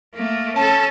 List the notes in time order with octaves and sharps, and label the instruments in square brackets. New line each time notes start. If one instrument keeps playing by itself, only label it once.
[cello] A3 A#3
[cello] C#4 A4 [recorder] A5